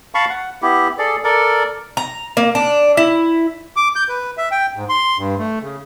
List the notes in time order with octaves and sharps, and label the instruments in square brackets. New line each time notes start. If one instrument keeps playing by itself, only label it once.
[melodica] F5 A5 B5 C#6
F#5
B3 E4 G4
G#4 A4 D5
A4 A#4 D5
[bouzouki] A#5
A#3
D4
E4
[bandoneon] D6
G6
B4
E5
G5
G#2
C6
G2
A3
C#3